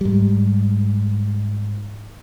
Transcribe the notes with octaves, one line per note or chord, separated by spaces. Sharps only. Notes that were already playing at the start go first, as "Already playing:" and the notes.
G#2 G3